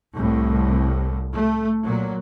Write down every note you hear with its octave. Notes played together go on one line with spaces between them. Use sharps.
C2 A2
A3
A#2 F#3